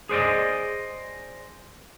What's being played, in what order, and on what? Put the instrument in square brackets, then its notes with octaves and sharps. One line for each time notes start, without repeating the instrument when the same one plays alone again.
[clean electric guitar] G#4 C5 D5 D#5